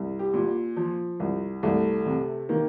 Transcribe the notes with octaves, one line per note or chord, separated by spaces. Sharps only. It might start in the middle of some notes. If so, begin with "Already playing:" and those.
Already playing: C2
G4
A#2
F3
C2
C2 A3
C3
D#3 A#3